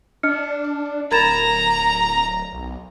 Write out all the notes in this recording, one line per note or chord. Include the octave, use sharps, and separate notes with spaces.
D4 D#5 F6 C#7
D1 A#4 A#5 B5 G#6 A6 E7
B1